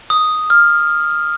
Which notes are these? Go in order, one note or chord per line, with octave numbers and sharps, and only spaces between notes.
D#6
F6